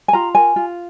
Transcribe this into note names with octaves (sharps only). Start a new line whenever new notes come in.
G#5
F4 A#5
A#4 G#5
F4